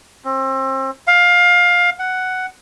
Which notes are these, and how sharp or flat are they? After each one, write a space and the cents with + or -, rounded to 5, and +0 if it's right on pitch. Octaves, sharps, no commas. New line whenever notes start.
C4 +30
F5 +20
F#5 +5